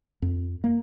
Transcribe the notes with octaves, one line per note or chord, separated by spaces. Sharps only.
F2
A#3